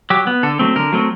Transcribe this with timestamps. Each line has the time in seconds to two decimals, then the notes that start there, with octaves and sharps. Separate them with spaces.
0.10 F#3 G4
0.27 B3
0.43 D3 A4
0.59 F#3 A3 C4
0.76 D3 A#4
0.92 F#3 A3 C4